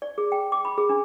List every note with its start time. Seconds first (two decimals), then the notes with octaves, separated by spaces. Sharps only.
0.02 D5
0.18 G#4
0.32 G5
0.52 D6
0.65 B5
0.78 G#4
0.89 D4